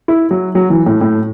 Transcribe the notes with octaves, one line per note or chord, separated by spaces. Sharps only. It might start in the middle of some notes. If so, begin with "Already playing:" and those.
E4
F#3
F#3
E3
A2
A2